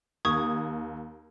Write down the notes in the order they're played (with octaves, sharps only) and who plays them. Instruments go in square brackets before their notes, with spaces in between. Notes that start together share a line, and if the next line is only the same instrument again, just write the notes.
[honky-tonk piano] D#2 [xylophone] C#6 D#6 G#6